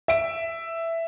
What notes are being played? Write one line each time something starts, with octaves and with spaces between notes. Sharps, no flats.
E5 D7